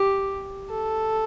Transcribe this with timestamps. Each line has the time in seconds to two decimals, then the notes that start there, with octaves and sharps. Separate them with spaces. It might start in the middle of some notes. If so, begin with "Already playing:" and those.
Already playing: G4
0.70 A4